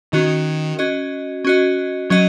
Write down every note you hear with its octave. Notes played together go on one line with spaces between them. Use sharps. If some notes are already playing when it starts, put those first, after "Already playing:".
D#3 C#4 F#4 D#5
C#4 F#4 D#5
C#4 F#4 D#5
F#3 C#4 F#4 D#5